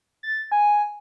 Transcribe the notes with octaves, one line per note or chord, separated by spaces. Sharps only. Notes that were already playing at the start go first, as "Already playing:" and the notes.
A6
G#5